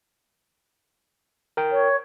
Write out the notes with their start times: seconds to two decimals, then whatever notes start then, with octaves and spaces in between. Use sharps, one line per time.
1.57 A#4 G5
1.72 C#5